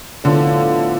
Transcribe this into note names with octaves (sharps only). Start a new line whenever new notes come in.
A2 D3 F3 B3 F4